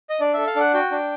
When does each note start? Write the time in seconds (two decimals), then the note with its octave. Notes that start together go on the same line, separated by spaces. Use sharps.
0.10 D#5
0.20 D4 D5
0.34 A4 E5
0.47 F5
0.56 D4 F#5
0.74 F#4 G5
0.92 D4